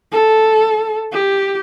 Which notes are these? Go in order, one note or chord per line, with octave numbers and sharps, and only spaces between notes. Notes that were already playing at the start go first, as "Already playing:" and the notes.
A4
G4